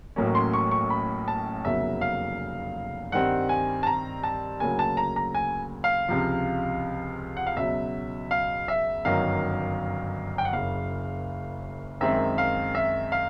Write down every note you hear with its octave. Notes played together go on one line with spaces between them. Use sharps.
A1 A2 F#3 A#3 C#4
C6
C#6
C#6
B5
A5
F1 E2 C#3 F#3 A#3 E5
F5
G2 D#3 G3 C4 F#5
G#5
A5
A#5
A5
D2 C#3 F#3 A#3 G#5
A5
A#5
A#5
G#5
F5
C#2 C3 F3
F#5
F5
C#2 B2 F#3 E5
F5
E5
G1 F#2 D#3 F#3 F5
G5
F#5
F#1 F#2 C#3 F5
F#2 D#3 G#3 C4 E5
F5
E5
F5